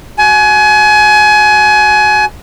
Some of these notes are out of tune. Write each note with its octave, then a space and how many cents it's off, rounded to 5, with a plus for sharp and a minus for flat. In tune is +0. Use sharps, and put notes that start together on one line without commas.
F#4 +15 G#5 +30